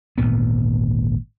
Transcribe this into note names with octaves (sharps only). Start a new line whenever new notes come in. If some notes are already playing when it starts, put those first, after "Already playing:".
G#1 D2 A#2 B3